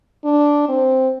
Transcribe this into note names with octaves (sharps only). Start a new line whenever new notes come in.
D4
C4